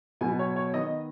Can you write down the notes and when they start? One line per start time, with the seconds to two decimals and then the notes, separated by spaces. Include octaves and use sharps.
0.21 B2 F#3 B3 G#5
0.39 C#5
0.56 C#5
0.73 D#3 B3 D#5